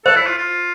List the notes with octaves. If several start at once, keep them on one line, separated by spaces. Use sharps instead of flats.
A4 C5
E4
F4
F4